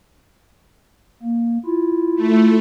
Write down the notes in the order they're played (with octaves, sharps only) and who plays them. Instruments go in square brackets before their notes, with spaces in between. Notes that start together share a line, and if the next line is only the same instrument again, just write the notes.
[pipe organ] A#3
E4 F4
[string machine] A3